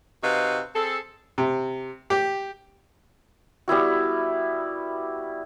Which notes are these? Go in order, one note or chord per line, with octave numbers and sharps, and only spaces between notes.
C3 D#4 F#4 B4 F5
C4 G#4 A4
C3
G4
G3 B3 E4 F#4